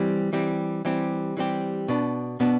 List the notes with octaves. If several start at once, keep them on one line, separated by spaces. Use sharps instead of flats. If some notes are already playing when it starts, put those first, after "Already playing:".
Already playing: E3 G3 C4 G4
E3 G3 C4 G4
E3 G3 C4 G4
E3 G3 C4 G4
B2 B3 D4
B2 B3 D4